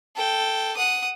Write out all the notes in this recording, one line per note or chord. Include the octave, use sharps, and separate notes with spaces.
A4 G5
F#5 D#6